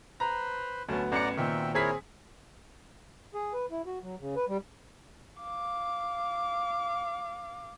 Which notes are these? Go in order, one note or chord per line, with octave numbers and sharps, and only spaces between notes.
B4 C5 A#5
D2 F#3 B3 C#4 A5
A1 D5 F#5 A#5 C#7
A#2 D#3 C4 E5 G5
C4 E4 G#4 A#4 C#5 B6
G#4
B4
E4
F#4
F#3
C#3
B4
G3
F5 D6